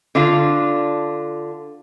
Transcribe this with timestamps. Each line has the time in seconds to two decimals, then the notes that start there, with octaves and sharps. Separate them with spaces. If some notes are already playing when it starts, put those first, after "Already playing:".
0.15 D3 D4 F4